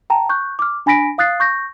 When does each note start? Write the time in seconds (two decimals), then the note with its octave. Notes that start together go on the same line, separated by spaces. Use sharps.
0.10 G5 A5 A#5
0.29 C#6 F#6 G6
0.59 D6 F6
0.86 D4 G#5 B5 A#6 B6 D7
1.18 F5 D#6 F#6 A6 C7
1.40 C#6 G6 A#6